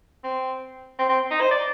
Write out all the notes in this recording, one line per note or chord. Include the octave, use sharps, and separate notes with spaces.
C4
C4
C4
D#4
C5
D5